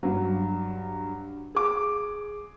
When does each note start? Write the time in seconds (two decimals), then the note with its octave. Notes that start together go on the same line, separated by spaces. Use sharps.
0.03 G2 F#3
1.55 G#4 D6